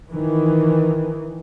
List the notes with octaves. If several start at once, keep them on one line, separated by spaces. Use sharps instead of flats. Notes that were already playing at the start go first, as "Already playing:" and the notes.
D#3 E3